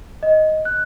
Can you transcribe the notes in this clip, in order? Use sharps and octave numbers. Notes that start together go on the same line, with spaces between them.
D#5
F#6